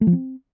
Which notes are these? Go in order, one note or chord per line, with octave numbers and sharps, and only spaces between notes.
A3
F3
C4